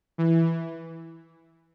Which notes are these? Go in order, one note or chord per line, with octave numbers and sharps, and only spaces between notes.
E3